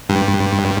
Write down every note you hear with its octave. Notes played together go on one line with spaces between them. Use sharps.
G2